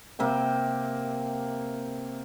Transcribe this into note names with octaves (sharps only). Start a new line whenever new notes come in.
C3 A#3 E5 G5